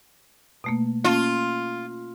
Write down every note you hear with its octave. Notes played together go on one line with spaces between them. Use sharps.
B2 A3 A#3
A#3 C#4 F4 A5